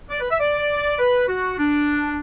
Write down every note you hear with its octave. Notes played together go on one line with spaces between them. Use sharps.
D5
B4
E5
D5
B4
F#4
D4